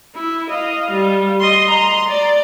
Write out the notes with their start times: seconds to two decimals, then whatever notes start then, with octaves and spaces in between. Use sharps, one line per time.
0.15 E4
0.50 D#5 F5
0.91 G3
1.40 D#5 C6
1.70 A#5 C6
2.08 D5